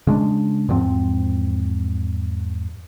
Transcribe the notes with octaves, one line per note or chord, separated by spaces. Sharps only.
C#3 G#3 D4
E2 G#2 F3 C4